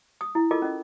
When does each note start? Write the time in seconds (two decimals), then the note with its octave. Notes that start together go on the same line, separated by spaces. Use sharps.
0.21 D#6
0.35 E4
0.51 F4 A4 A#4 D#5 D6
0.62 C#4 D#5